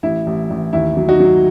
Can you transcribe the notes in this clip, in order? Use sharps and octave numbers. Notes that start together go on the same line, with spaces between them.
A1 E4
A1
A1
D#2 E4
F#3
D#4 F#4
F#3